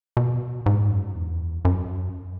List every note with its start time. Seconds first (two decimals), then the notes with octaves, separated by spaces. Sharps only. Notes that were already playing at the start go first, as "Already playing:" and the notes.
0.17 B2
0.66 G#2
0.90 F#2
1.15 E2
1.65 F#2